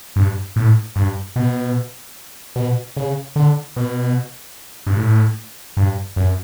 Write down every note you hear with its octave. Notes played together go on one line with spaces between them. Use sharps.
G2
A2
G2
B2
B2
C#3
D3
B2
G2
A2
G2
F#2